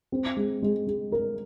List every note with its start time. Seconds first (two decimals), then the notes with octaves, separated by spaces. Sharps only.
0.12 C4
0.37 G#3
0.62 G#3
0.87 G#3
1.12 A#4